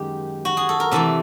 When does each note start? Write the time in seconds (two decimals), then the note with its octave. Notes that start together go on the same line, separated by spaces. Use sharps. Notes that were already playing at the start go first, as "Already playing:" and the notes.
Already playing: F#2 D#3 G#3 G4
0.45 F#4
0.57 G#4
0.69 A4
0.80 A#4
0.91 C3 E3 A3 A4